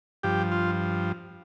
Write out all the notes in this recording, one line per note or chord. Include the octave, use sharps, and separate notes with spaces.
G2 F3 G4
F4